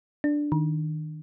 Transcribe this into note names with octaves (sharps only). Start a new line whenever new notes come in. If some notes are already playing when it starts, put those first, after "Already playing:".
D4
D#3